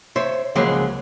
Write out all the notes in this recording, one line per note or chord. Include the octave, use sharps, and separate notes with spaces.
C5 C#5 E5
C#2 F3 F#3 G#3 A#3 G#4